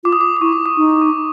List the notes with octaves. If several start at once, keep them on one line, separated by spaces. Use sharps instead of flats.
F4 D6
D#6
D6
D6
E4 C#6
D6
D6
D#4
C#6